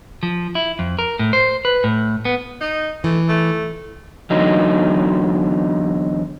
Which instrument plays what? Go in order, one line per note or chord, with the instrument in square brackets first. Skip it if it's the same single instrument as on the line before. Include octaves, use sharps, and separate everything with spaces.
[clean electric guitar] F3
E4
F2
A#4
A2
C5
B4
A2
B3
[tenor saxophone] D#4
[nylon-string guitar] E3 [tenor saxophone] A3
[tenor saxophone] A3
[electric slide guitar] E2 D3 F#3 D#4